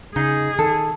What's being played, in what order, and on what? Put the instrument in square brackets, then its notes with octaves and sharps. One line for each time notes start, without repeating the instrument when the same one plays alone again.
[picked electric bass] C#3 [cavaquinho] D#4 [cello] G#4
[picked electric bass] D#3 [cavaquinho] A4